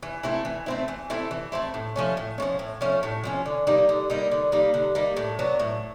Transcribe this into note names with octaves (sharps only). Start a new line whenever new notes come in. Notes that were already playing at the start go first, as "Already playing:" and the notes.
E3
A3 C4 E4
E3
A3 C4 E4
E3
A3 C4 E4
E3
A3 C4 E4
A2
F3 A3 C#4
A2
F3 A3 C#4
A2
F3 A3 C#4
A2
F3 A3 C#4
D3
G3 A#3 D#4
D3
G3 A#3 D#4
D3
G3 A#3 D#4
D3
G3 A#3 D#4
A2
F#3 B3 D4
A2